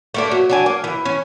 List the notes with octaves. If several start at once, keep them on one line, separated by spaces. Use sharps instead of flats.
A3 A#3 D4
F#3
F#3 D4 G#5
A#3
E3
C#4